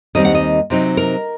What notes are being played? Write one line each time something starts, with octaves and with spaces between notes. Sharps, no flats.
D#2 D#3 G3 C4 D#5
F#5
D#5
C3 F#3 C4 D#4
A#4